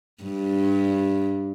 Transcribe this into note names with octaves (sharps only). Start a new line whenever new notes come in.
G2